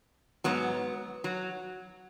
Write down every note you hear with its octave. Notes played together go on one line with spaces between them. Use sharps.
G#2 F#3 B3
F#3